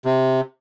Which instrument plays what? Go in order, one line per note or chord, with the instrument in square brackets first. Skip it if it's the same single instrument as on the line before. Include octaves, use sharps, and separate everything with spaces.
[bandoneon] C3